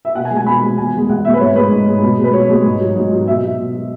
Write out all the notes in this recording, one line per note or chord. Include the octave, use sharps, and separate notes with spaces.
E5
B2 F#5
G#5
G#3
G#5
B2 B5
G#3
E2 G#5
B2 G#3
E2 F#5
B2 G#3 E5
B4
G#2 C#5
G#3 B4
G#2
G#3
B2
G#3
B4
B2 C#5
G#3
G#2
F#3
G#2
F#3
B2 E5
F#3
B2
F#3